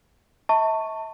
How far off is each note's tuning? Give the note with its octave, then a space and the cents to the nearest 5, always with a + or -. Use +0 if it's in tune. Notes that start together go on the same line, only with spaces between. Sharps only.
E5 -40 A5 +25 C#6 +0